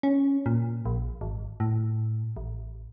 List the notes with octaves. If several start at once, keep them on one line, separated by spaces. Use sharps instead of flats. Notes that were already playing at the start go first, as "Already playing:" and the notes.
C#4
A#2
A#1
G#1
A2
A1